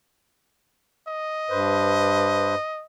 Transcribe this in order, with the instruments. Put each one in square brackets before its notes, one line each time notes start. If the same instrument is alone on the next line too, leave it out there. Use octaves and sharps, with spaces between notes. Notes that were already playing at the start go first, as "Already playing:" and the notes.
[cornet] D#5
[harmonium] G2 B4 C5